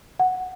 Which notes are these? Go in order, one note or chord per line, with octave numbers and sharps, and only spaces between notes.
F#5